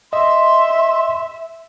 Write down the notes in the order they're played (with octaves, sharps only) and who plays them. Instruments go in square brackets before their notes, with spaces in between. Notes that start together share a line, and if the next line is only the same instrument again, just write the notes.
[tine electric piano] D#5 [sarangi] E5 [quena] C6